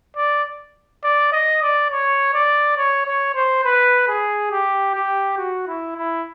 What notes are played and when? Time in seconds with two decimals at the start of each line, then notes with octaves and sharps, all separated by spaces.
0.17 D5
1.04 D5
1.32 D#5
1.62 D5
1.91 C#5
2.34 D5
2.78 C#5
3.06 C#5
3.35 C5
3.64 B4
4.08 G#4
4.51 G4
4.95 G4
5.38 F#4
5.67 E4
5.96 E4